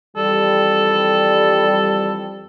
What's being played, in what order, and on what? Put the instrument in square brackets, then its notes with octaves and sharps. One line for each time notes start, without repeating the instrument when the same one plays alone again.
[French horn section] F2 E3 G3 [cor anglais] A4